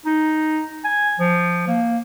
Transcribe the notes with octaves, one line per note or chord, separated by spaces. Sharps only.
D#4
G#5
F3
A#3